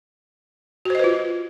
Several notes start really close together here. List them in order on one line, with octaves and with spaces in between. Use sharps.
F#4 C5 D#5 B4 F4